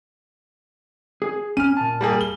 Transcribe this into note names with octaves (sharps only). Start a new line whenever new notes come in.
G#4
C#4 F6 D#7
A#2 A5
G3 A#3 G#4
G7